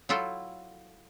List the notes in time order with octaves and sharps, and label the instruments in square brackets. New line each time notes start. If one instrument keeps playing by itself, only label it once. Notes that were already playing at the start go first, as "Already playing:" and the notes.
[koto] F#3 E4 F4 A4 G5